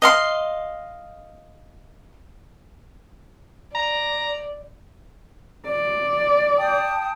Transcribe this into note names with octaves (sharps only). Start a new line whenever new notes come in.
D#5 F5 C6
D5 A#5
D5
G5 A5 D#6